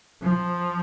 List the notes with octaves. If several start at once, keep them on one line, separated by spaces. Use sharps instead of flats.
F3